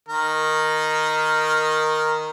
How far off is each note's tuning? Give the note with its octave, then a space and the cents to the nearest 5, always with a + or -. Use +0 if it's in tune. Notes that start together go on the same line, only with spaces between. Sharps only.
D#3 +0 A#4 +0